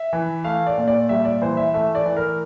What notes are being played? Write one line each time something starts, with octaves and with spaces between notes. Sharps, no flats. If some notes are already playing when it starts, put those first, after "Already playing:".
Already playing: E5
E3
A3 F5
D5
A#2
D5
G3 E5
D5
E3 C5
E5
A3 E5
D5
E3
A#4